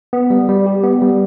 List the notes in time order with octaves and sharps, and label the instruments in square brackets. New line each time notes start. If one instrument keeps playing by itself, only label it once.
[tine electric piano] B3
G3
G3
G4
B3
G3